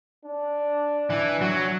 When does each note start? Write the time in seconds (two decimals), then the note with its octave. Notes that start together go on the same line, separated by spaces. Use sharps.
0.24 D4
1.10 E3
1.41 F#3